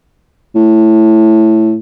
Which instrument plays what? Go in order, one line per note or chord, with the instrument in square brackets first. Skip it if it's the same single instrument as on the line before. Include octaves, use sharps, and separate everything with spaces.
[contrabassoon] A2